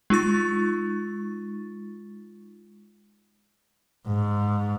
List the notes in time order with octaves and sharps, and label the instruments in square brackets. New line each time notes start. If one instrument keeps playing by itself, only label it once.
[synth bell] G#3 D#4 F4 C#6 A6
[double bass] G#2